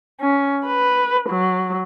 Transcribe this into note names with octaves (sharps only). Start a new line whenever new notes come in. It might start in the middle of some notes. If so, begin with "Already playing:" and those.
C#4
B4
F#3